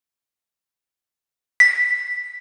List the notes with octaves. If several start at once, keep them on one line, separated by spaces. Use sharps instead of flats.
B6